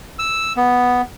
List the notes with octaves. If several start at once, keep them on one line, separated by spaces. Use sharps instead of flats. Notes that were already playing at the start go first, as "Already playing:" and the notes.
E6
B3